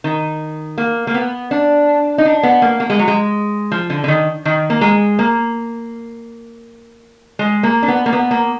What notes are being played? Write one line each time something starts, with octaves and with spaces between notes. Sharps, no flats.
D#3
A#3
A#3
B3
D4
D#4
D4
B3
A#3
A#3
G#3
F#3
G#3
F3
D3
D3
D#3
D#3
A#3
G#3
A#3
G#3
A#3
D4
B3
A#3
B3
A#3